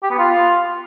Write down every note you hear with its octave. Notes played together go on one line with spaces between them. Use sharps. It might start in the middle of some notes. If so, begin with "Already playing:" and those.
G4
B3
F4